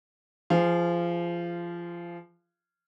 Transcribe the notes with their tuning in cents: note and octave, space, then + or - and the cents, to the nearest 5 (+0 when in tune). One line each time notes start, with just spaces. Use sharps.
F3 -20 G#4 +0 F5 -20